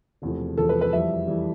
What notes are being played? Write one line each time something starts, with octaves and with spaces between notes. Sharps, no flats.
E1 E2 C3 F3 A3
E1 E2 C3 F3 A3 A4
B4
B4
F2 E3 G3 E5
E3 G3